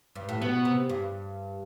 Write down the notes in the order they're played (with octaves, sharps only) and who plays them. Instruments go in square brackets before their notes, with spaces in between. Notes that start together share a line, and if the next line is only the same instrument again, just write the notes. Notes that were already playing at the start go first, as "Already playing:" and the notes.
[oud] G2
A2
[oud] B2 [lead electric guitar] B3
[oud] C3
G2